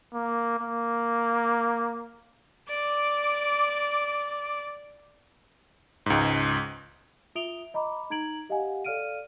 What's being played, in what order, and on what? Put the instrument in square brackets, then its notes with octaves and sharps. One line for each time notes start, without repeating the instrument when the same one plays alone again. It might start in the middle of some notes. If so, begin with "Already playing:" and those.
[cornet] A#3
A#3
[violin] D5 D6
[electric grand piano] C#2 G#2
[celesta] F4 E5 D#6 D7 F7 G7
D#5 A#5 B5 D6
D#4 A#5 G#6 D7 F#7
G4 D#5 F5 F#5 G#5
A4 D5 F5 F6 D7 D#7